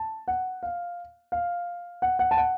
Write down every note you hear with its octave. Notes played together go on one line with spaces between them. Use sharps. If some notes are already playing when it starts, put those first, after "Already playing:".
Already playing: A5
F#5
F5
F5
F#5
F#5
A5
F#5